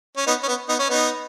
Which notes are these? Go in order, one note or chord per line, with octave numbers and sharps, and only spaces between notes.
C#4
B3 D#4
C#4
B3
B3 D#4
C#4
B3 D#4